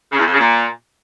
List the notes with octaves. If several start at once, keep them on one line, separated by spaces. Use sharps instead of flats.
C#3
E2
F2
C#3
A#2